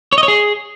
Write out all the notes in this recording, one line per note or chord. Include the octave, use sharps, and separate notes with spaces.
C#5
D#5
C#5
G#4